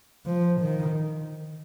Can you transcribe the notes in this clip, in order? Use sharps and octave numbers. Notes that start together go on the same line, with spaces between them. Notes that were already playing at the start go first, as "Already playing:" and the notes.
F3
D#3